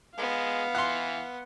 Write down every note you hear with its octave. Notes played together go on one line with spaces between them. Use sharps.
G#3 B3 F5
E3 F#5 C6